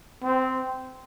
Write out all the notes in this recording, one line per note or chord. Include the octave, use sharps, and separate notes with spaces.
C4